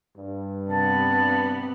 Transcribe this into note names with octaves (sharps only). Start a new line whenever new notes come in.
G2
C3 B3 A5